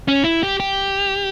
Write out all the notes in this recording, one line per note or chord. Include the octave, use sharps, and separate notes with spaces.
C#4
E4
G4
G4